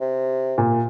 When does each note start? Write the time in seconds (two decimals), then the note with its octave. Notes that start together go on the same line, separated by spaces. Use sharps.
0.01 C3
0.58 A#2